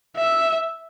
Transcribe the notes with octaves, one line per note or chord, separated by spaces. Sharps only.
E5